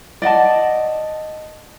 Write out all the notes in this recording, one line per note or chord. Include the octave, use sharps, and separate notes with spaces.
D5 D#5 F#5 A5